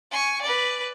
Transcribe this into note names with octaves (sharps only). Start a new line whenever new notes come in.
G#5 C#6
B4 D5